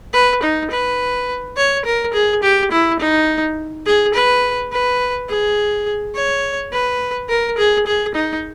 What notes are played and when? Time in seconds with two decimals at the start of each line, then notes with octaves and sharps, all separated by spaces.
0.13 B4
0.43 D#4
0.71 B4
1.57 C#5
1.85 A#4
2.14 G#4
2.43 G4
2.72 E4
3.00 D#4
3.86 G#4
4.14 B4
4.72 B4
5.29 G#4
6.15 C#5
6.73 B4
7.29 A#4
7.58 G#4
7.86 G#4
8.15 D#4